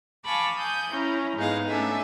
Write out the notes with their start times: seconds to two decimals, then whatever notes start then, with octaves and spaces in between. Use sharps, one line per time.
0.24 F5 G#5 A5 B5 C#6 D6
0.55 G#5 D#6 G6
0.91 C#4 E4 A#5
1.36 G#2 G#3 B3 D#4 G#4 F5
1.68 A3 C#4 D4 A4 E5 G#5